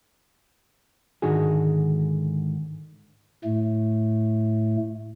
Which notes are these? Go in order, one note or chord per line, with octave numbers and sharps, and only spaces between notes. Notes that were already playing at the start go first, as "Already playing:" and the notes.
G#2 D3 D#3 G#3 F#4 G#4
A2 A3